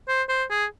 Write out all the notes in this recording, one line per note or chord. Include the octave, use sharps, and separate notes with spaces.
C5
C5
G#4